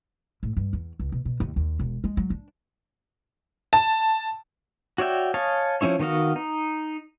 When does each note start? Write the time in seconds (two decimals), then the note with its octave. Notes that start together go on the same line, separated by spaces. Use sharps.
0.43 A2
0.57 G2
0.73 E2
0.99 C#2
1.12 B2
1.25 B2
1.40 D#2
1.56 D#2
1.79 E1
2.04 G#3
2.17 F#3
2.30 D4
3.73 A5
4.98 F#4 C#5 D5 E5 G5
5.34 C#5 D#5 F5 G#5 A5
5.81 F3 A3 C#4 E4 C#5
6.00 D#3 B3 F#4 D#5 F5
6.36 D#4